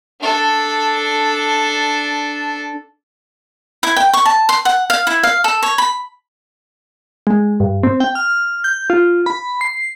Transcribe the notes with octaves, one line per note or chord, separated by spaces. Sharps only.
D4 A4
E4
G5
C#6
A5
C6
F#5
F5
E4
F5
A4
C#5
B5
G#3
G2
C4
G5
F6
G6
F4
B5
C7